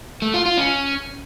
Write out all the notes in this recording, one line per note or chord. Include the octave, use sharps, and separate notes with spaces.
A3
F4
F4
C#4